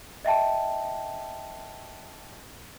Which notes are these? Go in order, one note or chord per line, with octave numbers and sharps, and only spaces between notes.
D#5 E5 G5 A5